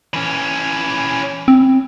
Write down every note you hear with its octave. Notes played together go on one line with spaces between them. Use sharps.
E3 C#4
C4